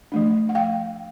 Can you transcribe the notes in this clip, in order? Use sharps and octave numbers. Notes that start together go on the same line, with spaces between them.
F3 A3 D4
F#5
F5 G5